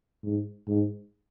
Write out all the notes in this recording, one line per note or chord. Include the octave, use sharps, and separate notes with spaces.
G#2
G#2